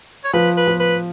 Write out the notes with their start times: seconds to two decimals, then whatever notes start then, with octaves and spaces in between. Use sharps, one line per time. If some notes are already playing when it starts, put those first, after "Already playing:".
0.24 C#5
0.33 F3 B4
0.57 B4
0.67 F3
0.80 B4